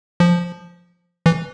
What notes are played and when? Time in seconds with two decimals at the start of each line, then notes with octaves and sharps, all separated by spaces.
0.20 F3
1.26 E3